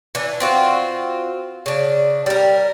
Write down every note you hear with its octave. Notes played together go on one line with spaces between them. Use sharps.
E3 D4
C4 F4 F#4
C#3 D4
G3 A#4